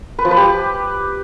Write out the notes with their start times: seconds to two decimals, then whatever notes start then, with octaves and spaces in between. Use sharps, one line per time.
0.19 B4
0.25 F3
0.31 B4
0.37 G4